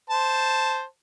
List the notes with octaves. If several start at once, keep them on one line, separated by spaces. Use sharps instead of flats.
C5 A5